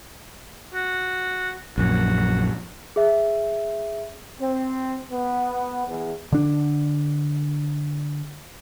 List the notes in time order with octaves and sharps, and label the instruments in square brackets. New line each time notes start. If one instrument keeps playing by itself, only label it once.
[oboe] F#4
[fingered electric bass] A#1 F#2 [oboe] F#4
[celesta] G#4 E5
[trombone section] C4
B3
E2
[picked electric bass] D3 D4